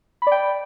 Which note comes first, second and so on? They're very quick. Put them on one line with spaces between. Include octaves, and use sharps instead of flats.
B5 D5 G5